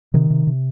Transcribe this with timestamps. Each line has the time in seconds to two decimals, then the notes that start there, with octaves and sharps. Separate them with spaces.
0.14 C3 D#3
0.30 C3
0.47 C3